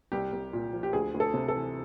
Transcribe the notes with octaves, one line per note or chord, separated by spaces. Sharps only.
C2 G4
C2
A#2
F3
G4
D2 G#4
D2
A4
C3
A4
E3